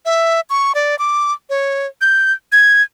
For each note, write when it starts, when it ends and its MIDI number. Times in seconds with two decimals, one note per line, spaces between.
0.05 0.41 76
0.50 0.72 85
0.75 0.98 74
0.99 1.32 86
1.50 1.87 73
2.01 2.33 91
2.52 2.83 92